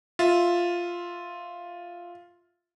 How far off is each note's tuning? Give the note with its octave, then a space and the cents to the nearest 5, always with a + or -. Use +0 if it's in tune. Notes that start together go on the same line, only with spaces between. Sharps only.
F4 +0 E5 +0